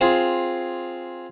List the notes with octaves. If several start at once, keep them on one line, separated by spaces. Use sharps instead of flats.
C4 F4 G#4